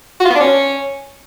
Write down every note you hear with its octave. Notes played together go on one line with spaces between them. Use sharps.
F#4
F4
B3
D4
C#4